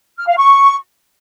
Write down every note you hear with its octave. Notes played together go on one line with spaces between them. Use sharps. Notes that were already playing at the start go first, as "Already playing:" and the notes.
F6
F5
C#6